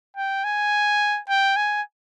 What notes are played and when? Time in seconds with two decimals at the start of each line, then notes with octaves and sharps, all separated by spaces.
0.16 G5
0.44 G#5
1.29 G5
1.56 G#5